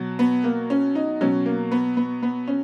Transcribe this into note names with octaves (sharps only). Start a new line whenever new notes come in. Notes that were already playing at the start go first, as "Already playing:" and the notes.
Already playing: B2 F#3
B3
A#3
C#4
D#4
B2 F#3 C#4
A#3
B3
B3
B3
C#4